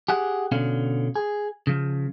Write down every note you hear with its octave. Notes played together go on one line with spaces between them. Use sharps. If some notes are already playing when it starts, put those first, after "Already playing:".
G4 G#4 F#5
B2 D3 C#4 F5
G#4
C#3 F3